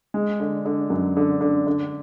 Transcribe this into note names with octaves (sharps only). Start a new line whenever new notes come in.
G#3
D3
D3
F#2
D3
D3
D3